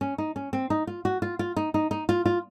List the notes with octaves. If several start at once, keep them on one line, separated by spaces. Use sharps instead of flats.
C#4
D#4
C#4
C4
D#4
F4
F#4
F4
F4
D#4
D#4
D#4
F4
F4